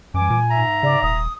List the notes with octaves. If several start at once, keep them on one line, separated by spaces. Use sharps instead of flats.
F#2 E3 G3 G#5 D6
A#2
G#2 E5 A#5
C#3 D5
D#1 D#6